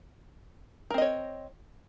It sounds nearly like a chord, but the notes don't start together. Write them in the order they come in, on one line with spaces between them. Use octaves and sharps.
A#4 C4 D#5 C#5